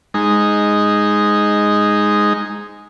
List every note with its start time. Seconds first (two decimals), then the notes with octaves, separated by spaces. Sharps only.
0.14 G#3 D#4